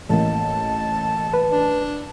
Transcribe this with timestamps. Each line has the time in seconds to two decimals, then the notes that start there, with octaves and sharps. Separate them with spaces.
0.09 A1 A#3 D#5 A5
1.33 B4
1.51 D4